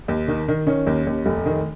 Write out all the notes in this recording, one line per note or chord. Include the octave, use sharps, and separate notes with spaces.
D#2
D#3
D#3
D#3 C#4
D#2
D#2
F1
D#3